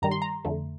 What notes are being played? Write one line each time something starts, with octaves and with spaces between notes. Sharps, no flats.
G2 D#3 G3 A#5
C6
A#5
F2 D3 A3